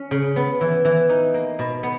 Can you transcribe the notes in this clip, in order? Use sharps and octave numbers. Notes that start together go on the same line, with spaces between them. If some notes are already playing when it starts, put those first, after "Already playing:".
Already playing: C#4
C#3
B3
E3
E3
D#4
A#3
B2
B3